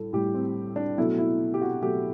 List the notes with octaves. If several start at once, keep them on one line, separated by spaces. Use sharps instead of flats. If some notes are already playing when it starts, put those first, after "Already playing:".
Already playing: A2 G3 A4
A2 G3 G4
C4
D4
B2 F#3 A3 E4
E4
G4
F#4
B2 F#3 A3 G4